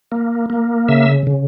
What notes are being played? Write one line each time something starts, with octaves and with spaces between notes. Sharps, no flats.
A#3
A#3
C#3 E5
C#3